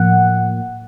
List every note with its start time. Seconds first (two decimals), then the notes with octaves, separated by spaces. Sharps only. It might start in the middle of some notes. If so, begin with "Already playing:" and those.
Already playing: A2 F3 A#3 F#5